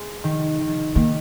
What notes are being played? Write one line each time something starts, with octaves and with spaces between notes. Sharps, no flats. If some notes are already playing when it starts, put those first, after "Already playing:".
Already playing: G#3
D#3
D#3
D#3 A#3